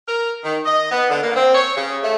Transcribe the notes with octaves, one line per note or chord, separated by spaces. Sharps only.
A#4
D#3
D#5
B3
D3
A#3
C4
C#5
C#3
A3